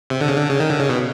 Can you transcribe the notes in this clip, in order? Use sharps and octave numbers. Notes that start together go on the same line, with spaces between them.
C3
D3
C#3
D3
C#3
D#3
D3
C#3
B2